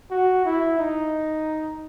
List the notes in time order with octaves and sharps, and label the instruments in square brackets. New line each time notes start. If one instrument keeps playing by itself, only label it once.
[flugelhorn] F#4
E4
D#4